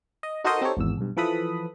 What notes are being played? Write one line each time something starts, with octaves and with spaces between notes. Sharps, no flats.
D#5
D#4 F#4 A4 A#4 C5 D#5
C4 D#4 G4 A4 C#5
G#1 E2 E6
B1 G2
E3 F3 A4 B4 B5 D#6